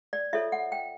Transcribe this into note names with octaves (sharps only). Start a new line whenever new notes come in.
D5
F4 A4 C#5 E5
F#5
G5